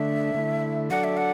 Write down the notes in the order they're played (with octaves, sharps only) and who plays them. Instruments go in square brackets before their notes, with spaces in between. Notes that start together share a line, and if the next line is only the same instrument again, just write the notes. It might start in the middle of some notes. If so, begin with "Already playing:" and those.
Already playing: [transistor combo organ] D3 A3 D4 [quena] E5
[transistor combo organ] D3 A3 E4
[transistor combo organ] F#3 D4 A4 D5 [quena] F#5
[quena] E5
F#5